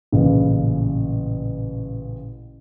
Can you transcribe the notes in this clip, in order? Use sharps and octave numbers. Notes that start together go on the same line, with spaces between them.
A1 A#2 C#3